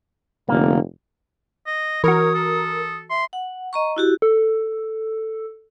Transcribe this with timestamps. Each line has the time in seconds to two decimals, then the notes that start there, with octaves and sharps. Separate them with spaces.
0.49 F1 D3 A#3
1.67 D#5
2.04 E3 F#4 A#4 C#5 D#6
2.35 A4
3.10 E5 C6
3.33 F#5
3.73 D#5 A#5 C#6
3.96 E4 F#4 G4
4.22 A4